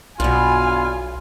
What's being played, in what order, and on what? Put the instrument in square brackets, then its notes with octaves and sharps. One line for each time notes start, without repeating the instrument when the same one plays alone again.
[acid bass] B1 [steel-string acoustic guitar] G2 B2 [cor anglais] F4 [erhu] G#5